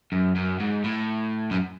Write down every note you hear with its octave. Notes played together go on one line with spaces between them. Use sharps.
F#2
F#2
G#2
A2
F#2